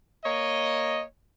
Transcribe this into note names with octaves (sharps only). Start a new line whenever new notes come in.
A#3 C#5 D#5